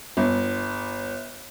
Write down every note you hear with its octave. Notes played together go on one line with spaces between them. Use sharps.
G1